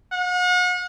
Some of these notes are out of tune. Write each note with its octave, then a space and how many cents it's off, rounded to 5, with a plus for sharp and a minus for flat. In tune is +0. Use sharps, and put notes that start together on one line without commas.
F#5 -40